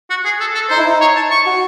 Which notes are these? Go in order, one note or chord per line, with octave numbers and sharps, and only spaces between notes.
F#4
G#4
A4
A4
D#4 C5
E4
D#4
C#5
A5
C#6
F#4